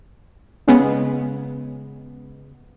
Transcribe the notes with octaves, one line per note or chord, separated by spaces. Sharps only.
C#3 G#3 B3